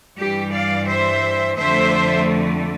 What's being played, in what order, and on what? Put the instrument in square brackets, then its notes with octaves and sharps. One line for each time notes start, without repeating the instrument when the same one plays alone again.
[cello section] G2 E3 G3 G4
D5 F5
C5 E5
F2 D3 A3 C5 E5